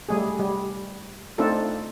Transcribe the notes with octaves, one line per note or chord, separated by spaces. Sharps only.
G3 A3 G#4
G3
A3 C4 D4 D#4 F4 A4